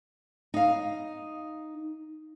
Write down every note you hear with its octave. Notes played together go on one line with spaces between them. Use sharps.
D#4 F5